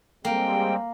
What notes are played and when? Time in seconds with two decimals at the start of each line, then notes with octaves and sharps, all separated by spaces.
0.25 G3 G#3 A#3 C4 G5